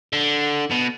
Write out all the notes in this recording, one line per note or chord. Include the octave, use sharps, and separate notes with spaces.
D3
B2